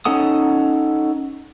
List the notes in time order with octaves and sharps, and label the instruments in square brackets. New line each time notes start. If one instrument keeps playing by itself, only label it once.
[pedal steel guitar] C#4 D#4 A4 F#5 D#6